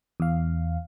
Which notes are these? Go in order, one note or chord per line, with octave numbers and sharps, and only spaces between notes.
E2 F5